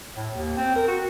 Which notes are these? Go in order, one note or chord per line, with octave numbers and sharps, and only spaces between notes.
A2
D#2
C4
A#4
F#4